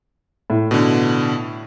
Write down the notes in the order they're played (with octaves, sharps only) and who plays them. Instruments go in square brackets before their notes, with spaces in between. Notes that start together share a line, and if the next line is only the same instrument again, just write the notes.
[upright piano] A2
[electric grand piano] B2 D3